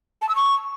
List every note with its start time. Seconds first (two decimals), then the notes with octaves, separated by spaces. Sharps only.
0.22 A5
0.29 E6
0.36 C#6